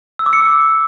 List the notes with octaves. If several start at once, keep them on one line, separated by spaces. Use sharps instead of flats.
E6
D6
C#7